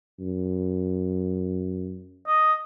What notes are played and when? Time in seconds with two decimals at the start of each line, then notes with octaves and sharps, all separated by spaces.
0.20 F#2
2.27 D#5